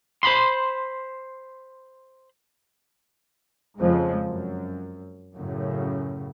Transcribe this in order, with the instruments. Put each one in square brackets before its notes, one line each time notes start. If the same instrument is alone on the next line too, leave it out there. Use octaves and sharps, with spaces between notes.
[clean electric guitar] C5 B5 C6
[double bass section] F2 C#3 F3 G#3
F#2
F#2 A2 C#3